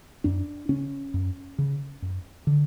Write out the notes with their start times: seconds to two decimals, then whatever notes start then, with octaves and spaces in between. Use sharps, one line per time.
0.24 F#2 D4
0.69 C#3 C#4
1.14 F#2
1.58 C#3
2.02 F#2
2.47 D3